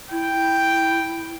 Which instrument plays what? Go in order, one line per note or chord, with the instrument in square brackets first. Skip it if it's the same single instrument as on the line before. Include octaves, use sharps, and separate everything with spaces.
[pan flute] E4 [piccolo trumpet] G5